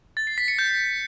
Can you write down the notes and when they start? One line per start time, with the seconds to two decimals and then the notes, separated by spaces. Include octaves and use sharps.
0.17 A6
0.27 C7
0.38 B6
0.48 C#7
0.59 G6